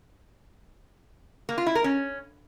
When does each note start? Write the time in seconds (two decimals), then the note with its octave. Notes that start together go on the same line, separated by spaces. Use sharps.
1.49 A#3
1.58 F4
1.66 E4
1.75 A#4
1.84 C#4